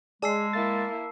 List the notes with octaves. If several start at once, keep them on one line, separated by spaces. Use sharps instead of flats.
G#3 G#4 D5 A5 E6 C7
A#3 E4 A6